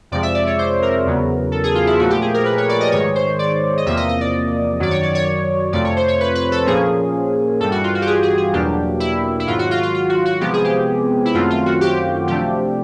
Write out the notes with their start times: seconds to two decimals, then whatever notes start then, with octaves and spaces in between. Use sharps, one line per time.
0.11 F2 C3 F3 G#3 D5
0.23 E5
0.35 D5
0.47 C#5
0.59 C5
0.82 A#4
1.05 E2 C#3 F#3 B3
1.52 A4
1.63 G#4
1.75 F4
1.87 E4
1.99 A#2 F3 A3 F#4
2.10 G4
2.22 G#4
2.34 A#4
2.45 B4
2.58 C#5
2.69 D5
2.80 D#5
2.92 G#2 D#3 G#3 C#5
3.15 C5
3.39 D5
3.77 D#5
3.86 E2 C3 F3 A#3 E5
3.97 D#5
4.09 D#5
4.21 D5
4.80 F#2 D#3 F#3 D5
4.91 C#5
5.03 D5
5.15 C#5
5.73 F2 C3 F3 A3 D5
5.85 C#5
5.96 C5
6.08 C#5
6.20 B4
6.35 B4
6.52 A4
6.66 A#2 F3 A#3 C#4 G#4
7.60 G2 E3 G3 A4
7.72 F#4
7.84 F4
7.95 F#4
8.02 G4
8.07 G#4
8.23 G#4
8.38 G#4
8.53 E2 B2 F#3 A#3 D4 G4
9.00 E4
9.40 E4
9.47 G#2 D#3 F#3 F4
9.59 F#4
9.71 F4
9.83 F4
9.95 F4
10.10 F#4
10.25 F#4
10.41 C3 F3 G#3 B3 G4
10.53 G#4
10.64 G4
11.25 E4
11.34 F#2 D#3 F#3 A3 C4 F4
11.50 F4
11.66 F#4
11.81 G4
12.28 C3 F3 A3 D4 G4